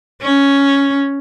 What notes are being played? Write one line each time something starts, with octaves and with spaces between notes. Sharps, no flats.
C#4